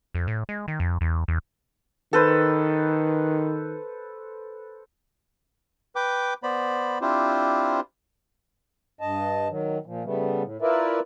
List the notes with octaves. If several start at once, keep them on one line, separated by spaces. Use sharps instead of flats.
F2
A2
G#3
D#3
F2
E2
E2
D#3 A4 B4 C5
B4 G5 D6
B3 C5 D5 B5
C4 D4 E4 F4 G4 C5
G2 D#5 A5
D#3 F#3
A#2 F3
C#3 G3 A3 B3
A2
E4 F4 A#4 B4 D5 E5